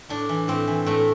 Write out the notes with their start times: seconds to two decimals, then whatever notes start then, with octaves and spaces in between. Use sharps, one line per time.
0.09 A2 D4
0.29 E3
0.48 A2 C4
0.67 E3
0.86 A2 A3